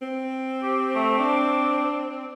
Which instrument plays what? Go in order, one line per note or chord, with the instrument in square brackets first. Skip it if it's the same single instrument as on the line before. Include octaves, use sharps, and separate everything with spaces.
[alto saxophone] C4
[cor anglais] G4
A3
D4